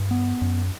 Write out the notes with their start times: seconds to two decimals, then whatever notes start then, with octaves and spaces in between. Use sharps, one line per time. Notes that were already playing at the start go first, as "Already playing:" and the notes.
Already playing: G2
0.11 B3
0.42 F#2